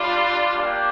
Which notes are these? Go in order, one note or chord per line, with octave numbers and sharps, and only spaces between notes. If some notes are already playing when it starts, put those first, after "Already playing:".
Already playing: G3 D4 F4
A#3 D4 G4